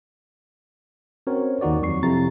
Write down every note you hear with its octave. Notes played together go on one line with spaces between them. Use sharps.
C4 C#4 F#4 A#4 C5 C#5
D#2 D#3 D#4 F#4 D5
F2 F#3 C#6 C7
F2 C3 E4 A#5 A6